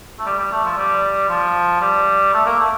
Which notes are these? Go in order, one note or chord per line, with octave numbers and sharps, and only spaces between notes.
A3
G3
G3
A3
F3
G3
F3
G3
A3
A#3
A3